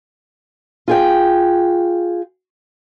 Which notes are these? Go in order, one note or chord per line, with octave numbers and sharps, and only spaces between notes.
F4 G#4 G5